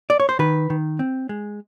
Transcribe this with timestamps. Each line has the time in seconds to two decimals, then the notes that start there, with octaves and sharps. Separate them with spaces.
0.10 D5
0.20 C#5
0.29 C5
0.39 D#3 B4
0.70 D#3
0.99 C4
1.29 G#3